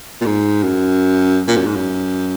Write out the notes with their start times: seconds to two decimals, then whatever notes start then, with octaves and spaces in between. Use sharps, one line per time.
0.21 A#2
0.26 G#2
0.63 F#2
1.48 A#2
1.57 F#2
1.66 G#2
1.76 F#2